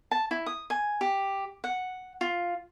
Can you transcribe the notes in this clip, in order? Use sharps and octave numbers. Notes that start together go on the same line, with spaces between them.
A5
E4
D#6
G#5
G4
F#5
F4